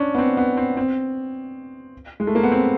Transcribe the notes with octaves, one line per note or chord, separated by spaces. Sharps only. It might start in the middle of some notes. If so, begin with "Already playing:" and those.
Already playing: C#4 D4
B3
C4
B3
C4
C4
G#3
A3
A#3
B3
C4